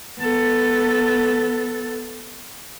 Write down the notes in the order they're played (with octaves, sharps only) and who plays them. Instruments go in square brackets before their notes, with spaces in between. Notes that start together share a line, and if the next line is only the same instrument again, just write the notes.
[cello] B3 A4